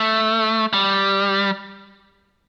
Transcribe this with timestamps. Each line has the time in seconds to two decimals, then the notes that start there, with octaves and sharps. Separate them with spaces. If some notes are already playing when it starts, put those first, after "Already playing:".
Already playing: A3
0.73 G3